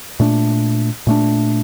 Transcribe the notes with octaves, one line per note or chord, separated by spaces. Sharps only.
A#2 A3 D4
A#2 A3 D4